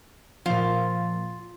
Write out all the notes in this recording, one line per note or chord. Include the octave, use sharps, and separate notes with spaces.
A#2 F3 F4